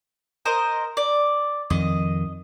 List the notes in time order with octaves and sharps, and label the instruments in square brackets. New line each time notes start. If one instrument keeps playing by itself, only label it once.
[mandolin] A#4 C5 D#5
D5
[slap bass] F2 D#3 [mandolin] D#5